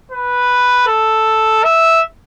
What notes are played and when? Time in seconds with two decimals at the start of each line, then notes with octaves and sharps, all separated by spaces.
0.11 B4
0.87 A4
1.64 E5